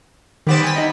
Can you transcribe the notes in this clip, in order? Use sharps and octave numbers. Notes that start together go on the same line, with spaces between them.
D#3 G3 B3 C4 D6 E7
G#5 B6
D#4 D#5